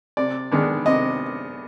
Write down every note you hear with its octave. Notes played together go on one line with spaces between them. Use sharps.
C3 D5
D#3 G#3 B3 D4
C3 D#5